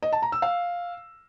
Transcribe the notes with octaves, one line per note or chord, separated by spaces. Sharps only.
D#5
A5
A#5
E6
F5